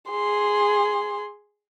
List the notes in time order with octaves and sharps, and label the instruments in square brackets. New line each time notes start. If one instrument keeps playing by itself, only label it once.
[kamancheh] G#4 C6